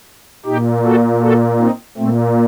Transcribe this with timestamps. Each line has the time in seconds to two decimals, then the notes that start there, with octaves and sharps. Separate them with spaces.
0.46 A#2 D#4 G4
0.84 F#4 A4
1.21 F#4 A4
1.59 C4 D#4
1.98 A#2 A3 C4